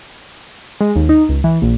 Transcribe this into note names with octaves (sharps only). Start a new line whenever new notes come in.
G#3
D#2
D#4
C#2
E3
A#1